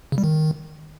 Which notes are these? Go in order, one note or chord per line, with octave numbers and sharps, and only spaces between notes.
C#3
G3
D#3